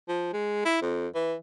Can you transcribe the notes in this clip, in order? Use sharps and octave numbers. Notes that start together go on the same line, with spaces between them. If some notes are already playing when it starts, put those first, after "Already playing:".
F3
G#3
E4
F2
E3